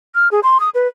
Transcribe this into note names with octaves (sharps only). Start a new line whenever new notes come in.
F6
G#4
C6
D#6
B4